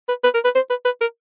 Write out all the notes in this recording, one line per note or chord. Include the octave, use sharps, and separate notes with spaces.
B4
B4
A#4
B4
C5
B4
B4
A#4